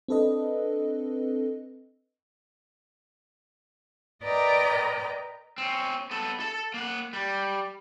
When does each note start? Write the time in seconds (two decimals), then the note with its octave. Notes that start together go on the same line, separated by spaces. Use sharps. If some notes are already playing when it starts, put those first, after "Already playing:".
0.08 C4 D4 A4 B4 D#5
4.24 A#4 B4 D5 D#5 G5 A#5
5.58 C4 C#4
6.11 B3 A4
6.40 A4 A5
6.74 A#3 F#5
7.13 G3